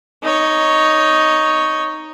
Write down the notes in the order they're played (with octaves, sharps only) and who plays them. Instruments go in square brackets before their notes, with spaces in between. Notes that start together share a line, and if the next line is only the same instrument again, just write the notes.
[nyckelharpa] D#4 C#5